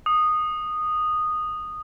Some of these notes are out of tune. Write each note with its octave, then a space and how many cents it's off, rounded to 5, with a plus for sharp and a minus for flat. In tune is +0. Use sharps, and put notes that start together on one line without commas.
D#6 -10